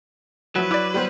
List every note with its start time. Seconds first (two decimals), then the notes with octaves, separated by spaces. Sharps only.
0.56 F3 F#3 E4 F#4 B4
0.71 E4 D5 D6
0.94 G3 B3 C5